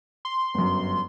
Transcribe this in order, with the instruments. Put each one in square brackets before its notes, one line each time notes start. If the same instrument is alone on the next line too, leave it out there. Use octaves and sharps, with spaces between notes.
[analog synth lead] C6
[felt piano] G1 F#2